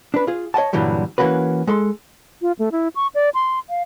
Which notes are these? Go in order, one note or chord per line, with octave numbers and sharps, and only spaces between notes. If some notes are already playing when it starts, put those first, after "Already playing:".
D4 B4
F4 G#4
C#5 D#5 F#5 A5
G2 A#2 D3 E3 F#3 G3
E3 A#3 C#4 F#4 B4
G#3 A4 C6
F4
A3
E4
C#6
D5
C6
F5